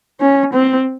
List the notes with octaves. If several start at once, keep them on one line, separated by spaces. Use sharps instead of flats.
C#4
C4